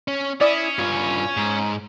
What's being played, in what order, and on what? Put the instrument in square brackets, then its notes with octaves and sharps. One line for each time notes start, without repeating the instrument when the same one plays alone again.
[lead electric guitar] C#4
[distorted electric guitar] C#4 [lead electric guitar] E4 [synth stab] D5 D#6
[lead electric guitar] G2 F4
G#2